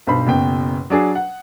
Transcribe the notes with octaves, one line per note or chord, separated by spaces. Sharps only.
B1 G2 C5 B5
F#1 F#2 B2 G5
F#3 D4 G#4
F#5